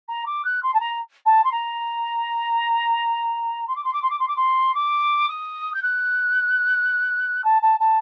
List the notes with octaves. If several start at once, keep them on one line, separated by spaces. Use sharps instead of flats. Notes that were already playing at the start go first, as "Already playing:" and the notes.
A#5
D6
F#6
C6
A5
A#5
A5
C6
A#5
C6
D6
C6
D6
C6
D6
C6
D6
C6
D6
D#6
G6
F#6
A5
A5
A5